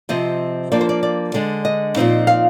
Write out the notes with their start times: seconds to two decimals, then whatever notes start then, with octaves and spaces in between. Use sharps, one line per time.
0.09 C3 F3 C4 D#5
0.72 F3 A#3 D4 D5
0.81 C5
0.89 D5
1.03 D5
1.34 D3 G#3 D4
1.65 D#5
1.96 A#2 F3 C4 D#4
2.27 F5